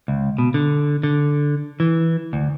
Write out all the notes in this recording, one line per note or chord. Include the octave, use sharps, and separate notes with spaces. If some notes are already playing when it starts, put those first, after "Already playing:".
C#2
B2
D3
D3
E3
D2